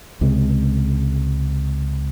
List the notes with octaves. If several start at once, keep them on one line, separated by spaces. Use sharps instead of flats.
C#2 C3 G#3